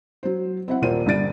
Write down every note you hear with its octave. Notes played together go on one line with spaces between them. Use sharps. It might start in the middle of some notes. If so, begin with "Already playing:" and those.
F#3 C5
C4 E4 F#5
D#1 A#2 A#3 F4 C5 D#7
G1 G3 D4 A6 D7 D#7